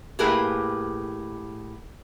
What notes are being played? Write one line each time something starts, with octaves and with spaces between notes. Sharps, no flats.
A2 A#3 G4 G#4 A#4 B4